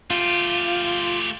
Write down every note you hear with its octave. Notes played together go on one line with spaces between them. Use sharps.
A3 F4 G4